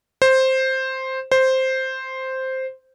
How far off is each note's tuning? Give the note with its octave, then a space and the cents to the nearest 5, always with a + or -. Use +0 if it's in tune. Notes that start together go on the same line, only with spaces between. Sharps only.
C5 +5
C5 +0